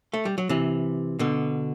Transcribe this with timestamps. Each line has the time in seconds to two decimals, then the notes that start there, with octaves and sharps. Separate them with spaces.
0.13 A3
0.25 G3
0.38 F#3
0.49 C3 E3
1.19 B2 D3